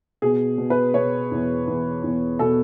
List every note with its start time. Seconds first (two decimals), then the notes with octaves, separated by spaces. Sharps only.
0.22 B2 G#4
0.58 B2
0.70 B4
0.94 B2 C#5
1.32 E2
1.67 E2
2.04 E2
2.39 B2 A4